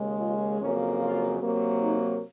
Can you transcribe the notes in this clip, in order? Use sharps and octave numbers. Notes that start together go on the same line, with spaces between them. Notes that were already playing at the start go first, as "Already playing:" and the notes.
Already playing: D#2 C#3 G#3
F4
F2 C#3 F#3 A#3 C#4
F4
C3 F#3 A#3
D#4